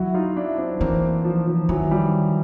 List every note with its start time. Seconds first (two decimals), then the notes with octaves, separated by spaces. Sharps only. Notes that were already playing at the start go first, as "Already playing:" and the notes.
Already playing: F#3 E4 F#4
0.14 D#4 F4
0.36 D4 E4
0.58 C4 D4
0.81 E3 A#3 C4
1.24 F3
1.47 F3
1.69 D#3 E3 F#3
1.91 F3 G3